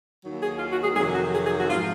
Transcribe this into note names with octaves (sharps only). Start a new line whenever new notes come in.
D#2 D#3 F#3
G#4
F4
F#4
G#4
F2 C3 D#3 F#3 G#4
F#4
G#4
G#4
F#4
G#2 F3 F4